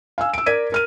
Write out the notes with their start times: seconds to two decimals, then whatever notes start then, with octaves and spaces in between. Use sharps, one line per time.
0.18 F5 G#5 E6
0.34 E6 D7
0.46 A#4 D5 G#6 B6 D#7
0.72 A#4 F6 D#7